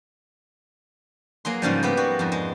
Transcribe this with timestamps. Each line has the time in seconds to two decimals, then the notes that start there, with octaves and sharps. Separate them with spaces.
1.45 F#3 A#3 G#4 C6
1.62 G#2 C#3 F3 G3
1.83 A#3 B3 G4
1.97 G3 F#4
2.19 F2 G#2
2.32 G#3